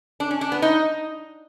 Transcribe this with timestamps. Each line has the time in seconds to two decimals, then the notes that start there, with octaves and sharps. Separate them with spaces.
0.20 D4
0.31 C#4
0.41 D4
0.52 B3
0.62 D#4